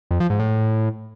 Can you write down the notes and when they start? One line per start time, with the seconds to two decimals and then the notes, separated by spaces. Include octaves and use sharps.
0.11 F2
0.20 F3
0.30 G#2
0.40 A2